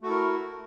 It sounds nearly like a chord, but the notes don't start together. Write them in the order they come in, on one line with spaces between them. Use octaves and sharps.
A3 F#4 A4 E4 A#4